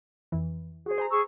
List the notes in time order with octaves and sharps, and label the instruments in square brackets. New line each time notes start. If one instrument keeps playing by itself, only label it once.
[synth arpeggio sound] F2 E3
[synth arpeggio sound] F#4 C5 [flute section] G#4
[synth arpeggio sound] C5 G#5 A#5
[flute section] G#4 C#6 E6